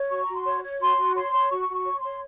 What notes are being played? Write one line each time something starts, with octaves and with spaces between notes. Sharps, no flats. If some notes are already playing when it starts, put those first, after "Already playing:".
Already playing: C#5
F#4 C#6
F#4 A#5
C6
C#5
C#5
F#4 C6
F#4
C#5 C6
C#5
F#4 C#6
F#4
C#6
C#5
C6
C#5